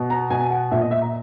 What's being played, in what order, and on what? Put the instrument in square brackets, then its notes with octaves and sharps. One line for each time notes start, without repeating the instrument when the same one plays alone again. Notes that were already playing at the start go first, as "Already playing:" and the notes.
Already playing: [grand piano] B2
A#5
B2 G#5
F#5
A#2 E5
D#5
E5
A#5